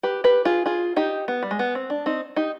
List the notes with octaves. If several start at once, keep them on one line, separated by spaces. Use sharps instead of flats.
G4 B4
G4 B4
F4 G#4
F4 G#4
D#4 G4
B3
G3
G#3
B3
C4
D4
C4 D#4
D#4 G4